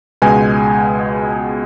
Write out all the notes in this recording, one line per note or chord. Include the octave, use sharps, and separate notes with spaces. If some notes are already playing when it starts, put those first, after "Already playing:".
C#2 B2 G#3 B3 G#5